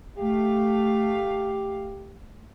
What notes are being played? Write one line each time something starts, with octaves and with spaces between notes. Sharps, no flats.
A3 G4 F5